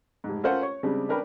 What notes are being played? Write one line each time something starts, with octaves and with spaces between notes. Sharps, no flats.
F1 G#2
C#4 F4 A4 A#4 C5 F#5
C#5 C#6
C#3 G3 G#3 C4 D4
C#4 D4 A#4 B4 G5 B5